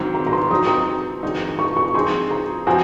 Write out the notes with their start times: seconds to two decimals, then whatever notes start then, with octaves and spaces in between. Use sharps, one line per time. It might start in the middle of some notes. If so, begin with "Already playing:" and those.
Already playing: G#2 D#3 F#3 C4
0.15 A#5
0.27 A#5
0.33 C6
0.51 F#3 C4 D#4 D#6
0.67 D#6
1.23 F2 D#3 G#3 D#4 F#4
1.59 C#6
1.77 C#6
1.94 F3 C4 D#4 G#4 C6
2.31 A#5
2.67 F3 C4 F#4 G#5